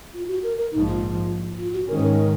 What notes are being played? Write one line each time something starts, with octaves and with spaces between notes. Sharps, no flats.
F4
F#4
A#4
A#4
A#1 G#2 F3 D#4
F4
F4
F#4
G#2 D#3 G#3 C#4 A#4
C5
A#4